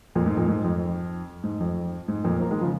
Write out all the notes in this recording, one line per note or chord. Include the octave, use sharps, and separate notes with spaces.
F2 A#2
G#2
F2 A#2
G#2
F2
G#2
F2
G#2
F2 A#2
F3 A#3
D#3 G#3
C#3 F3